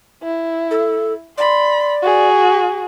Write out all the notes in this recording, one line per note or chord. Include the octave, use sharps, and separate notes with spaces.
E4
A4
D5 B5 C6
F#4 G#4